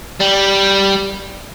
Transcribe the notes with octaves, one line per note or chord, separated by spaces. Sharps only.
G3